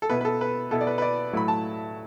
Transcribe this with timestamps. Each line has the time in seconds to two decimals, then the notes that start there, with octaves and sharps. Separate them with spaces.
0.02 A4
0.10 B2 B3 E4 B4
0.21 B4
0.25 A4
0.41 B4
0.71 B2 B3 E4 A4
0.81 D5
0.87 B4
0.98 B4
1.02 D5
1.33 A2 F#3 A3 E4 B5
1.48 A5